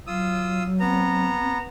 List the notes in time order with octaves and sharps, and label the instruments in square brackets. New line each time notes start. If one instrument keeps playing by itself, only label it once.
[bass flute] F#3 [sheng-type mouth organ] F4 D#6 E6
[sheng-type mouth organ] B3 A#5 [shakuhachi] C4